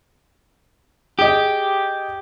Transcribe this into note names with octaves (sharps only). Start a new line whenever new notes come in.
G4 G#4 D#5